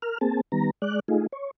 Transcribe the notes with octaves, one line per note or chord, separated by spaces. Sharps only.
A#4 F6
A#3 C4 G#4 A5
D#3 G3 B3 A#5
G#3 D5 F#6
A3 D#4 F4 G#4
C#5